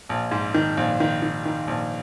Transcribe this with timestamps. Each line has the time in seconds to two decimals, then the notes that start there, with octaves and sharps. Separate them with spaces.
0.09 A#1
0.31 G#2
0.54 D#3
0.77 A#1
1.00 D#3
1.22 D#3
1.45 D#3
1.67 A#1